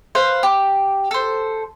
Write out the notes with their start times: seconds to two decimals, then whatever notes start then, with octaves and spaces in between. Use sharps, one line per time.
0.15 B4 C5 F5
0.43 G4
1.11 A4 C5